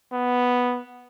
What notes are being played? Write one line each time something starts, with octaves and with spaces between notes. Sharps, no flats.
B3